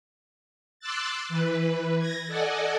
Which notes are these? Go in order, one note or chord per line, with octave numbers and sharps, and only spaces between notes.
C6 D6 E6 F#6 A6
E3 B4
G#6 A#6
A4 D5 D#5 F#5 G#5